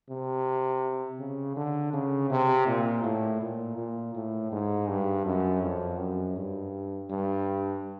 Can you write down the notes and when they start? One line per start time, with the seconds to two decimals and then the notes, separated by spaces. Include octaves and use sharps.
0.10 C3
1.20 C#3
1.57 D3
1.93 C#3
2.30 C3
2.67 A#2
3.04 A2
3.41 A#2
3.78 A#2
4.15 A2
4.52 G#2
4.88 G2
5.25 F#2
5.63 F2
5.99 F#2
6.36 G2
7.10 G2